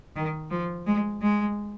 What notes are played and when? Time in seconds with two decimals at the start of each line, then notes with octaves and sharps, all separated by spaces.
0.16 D#3
0.51 F3
0.86 G#3
1.22 G#3